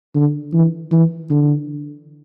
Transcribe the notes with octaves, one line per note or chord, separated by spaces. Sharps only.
D3
E3
E3
D3